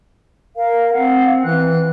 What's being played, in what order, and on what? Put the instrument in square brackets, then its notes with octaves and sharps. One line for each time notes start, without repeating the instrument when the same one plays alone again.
[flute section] A#4 F5
[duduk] C4 [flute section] F5 F#5
[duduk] E3 [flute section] F#6